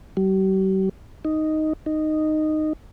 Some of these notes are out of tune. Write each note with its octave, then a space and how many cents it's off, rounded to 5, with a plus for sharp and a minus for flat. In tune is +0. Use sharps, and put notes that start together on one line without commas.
G3 -45
D#4 +0
D#4 -10